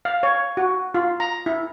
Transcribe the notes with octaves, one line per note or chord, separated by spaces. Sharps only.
F5
C#5
F#4
F4
A#5
E4